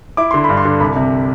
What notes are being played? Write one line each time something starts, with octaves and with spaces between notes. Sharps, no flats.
E4 D6
D3 C6
B5
G2
C6
D3
C2 B5
C3